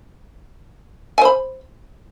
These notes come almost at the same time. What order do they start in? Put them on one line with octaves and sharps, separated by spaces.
G#5 C5 B5